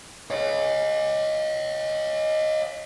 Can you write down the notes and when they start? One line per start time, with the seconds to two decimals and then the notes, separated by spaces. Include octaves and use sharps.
0.30 C#5 D#5